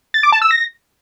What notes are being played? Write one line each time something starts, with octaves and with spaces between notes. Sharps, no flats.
A6
D6
A5
E6
A#6